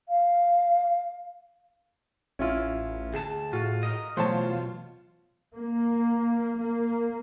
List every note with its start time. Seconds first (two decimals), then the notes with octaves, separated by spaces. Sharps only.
0.09 F5
2.39 A1 C#4 E4 F4
3.14 D2 G#4 A5
3.53 A2 F4 F#4
3.83 A#4 D#5
4.17 B2 E3 F#3 A3 F4 C5 C#5 A5
5.54 A#3
6.57 A#3